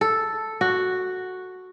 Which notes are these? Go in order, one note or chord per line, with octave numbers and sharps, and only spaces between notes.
A4
F#4